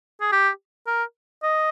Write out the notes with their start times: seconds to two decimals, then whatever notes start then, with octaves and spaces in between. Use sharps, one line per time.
0.21 G#4
0.32 G4
0.87 A#4
1.43 D#5